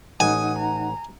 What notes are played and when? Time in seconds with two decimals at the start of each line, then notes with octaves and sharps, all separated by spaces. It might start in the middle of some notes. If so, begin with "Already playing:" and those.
0.20 A1 D#4 F#5 G#5 D#6
0.59 A#5